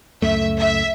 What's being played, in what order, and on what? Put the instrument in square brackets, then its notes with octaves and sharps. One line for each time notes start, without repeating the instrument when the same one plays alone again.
[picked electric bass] C#2 F#2 A3 [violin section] E5
[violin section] E5